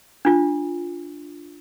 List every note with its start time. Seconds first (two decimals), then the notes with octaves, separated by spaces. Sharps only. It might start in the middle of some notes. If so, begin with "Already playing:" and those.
0.25 D4 F4